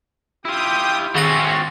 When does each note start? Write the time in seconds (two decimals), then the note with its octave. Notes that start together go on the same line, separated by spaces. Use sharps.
0.45 E4 F4 G4 G5 D#6
1.15 D#3 A3 C4 C#4 F#4 C#5 C#6 A#6